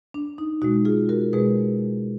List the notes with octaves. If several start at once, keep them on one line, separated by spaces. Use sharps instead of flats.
D4
D#4
B2 G#3 D#4 F#4
F4 G#4
F#4 A#4
B2 G#3 G#4 B4